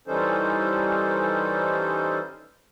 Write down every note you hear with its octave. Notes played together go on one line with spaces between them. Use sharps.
E3 G3 C#4 D#4 A4 C5